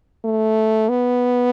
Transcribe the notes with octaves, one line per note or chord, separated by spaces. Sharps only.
A3
B3